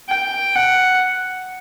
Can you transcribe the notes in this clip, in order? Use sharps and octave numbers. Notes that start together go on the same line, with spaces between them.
G5
F#5